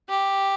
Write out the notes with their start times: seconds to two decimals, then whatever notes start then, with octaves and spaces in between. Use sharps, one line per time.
0.09 G4